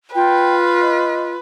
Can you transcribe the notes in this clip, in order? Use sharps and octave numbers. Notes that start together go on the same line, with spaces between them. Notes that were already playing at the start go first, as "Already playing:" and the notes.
F4 B4 G5
D#5